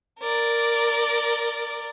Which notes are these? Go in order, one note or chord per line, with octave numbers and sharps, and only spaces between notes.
A#4 D5